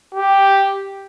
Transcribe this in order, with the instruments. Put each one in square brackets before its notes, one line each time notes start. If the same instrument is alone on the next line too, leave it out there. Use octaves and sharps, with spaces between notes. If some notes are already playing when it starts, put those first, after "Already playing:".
[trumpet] G4